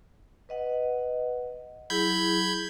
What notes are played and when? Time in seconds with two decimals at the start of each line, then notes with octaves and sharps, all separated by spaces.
0.49 B4 D#5 F#5
1.90 F#3 E4 G#4 B5 G6 G#6